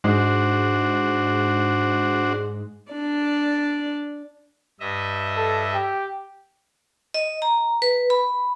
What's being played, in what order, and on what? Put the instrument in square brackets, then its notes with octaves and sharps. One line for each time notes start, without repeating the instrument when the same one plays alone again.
[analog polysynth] G#2 G#3 [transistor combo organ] D4 F#4 C5
[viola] D4 D5
[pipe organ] G2 D#5 E5
[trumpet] A4
G4
[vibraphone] D#5
A#5
B4
B5